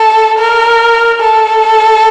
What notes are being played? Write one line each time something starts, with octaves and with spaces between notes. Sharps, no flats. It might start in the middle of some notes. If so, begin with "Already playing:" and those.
Already playing: A4
A#4
A4